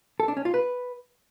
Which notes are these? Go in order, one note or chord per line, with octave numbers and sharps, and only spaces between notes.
A4
D4
C#4
F4
B4